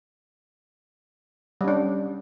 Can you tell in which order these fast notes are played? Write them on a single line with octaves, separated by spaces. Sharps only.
G3 C#4 D4